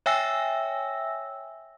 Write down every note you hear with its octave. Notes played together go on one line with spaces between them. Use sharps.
C#5 E5 G5 G#5 E6 A#6